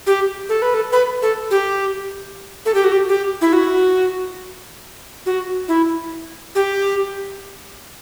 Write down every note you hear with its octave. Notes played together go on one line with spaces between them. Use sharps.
G4
A4
B4
A4
B4
A4
G4
A4
G4
F#4
G4
G4
E4
F#4
F#4
E4
G4